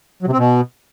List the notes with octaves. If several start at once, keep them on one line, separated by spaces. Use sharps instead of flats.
F#3
C3
C4
B2